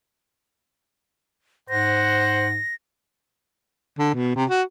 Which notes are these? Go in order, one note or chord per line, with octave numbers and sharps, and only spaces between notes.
G#2 C5 F#5 A#6
D3
B2
C3
F#4